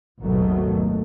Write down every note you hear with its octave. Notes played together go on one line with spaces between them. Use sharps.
G#1 D#2 B2 D#3 F#3 A3